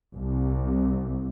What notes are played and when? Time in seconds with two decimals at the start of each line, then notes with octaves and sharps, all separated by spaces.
0.14 C2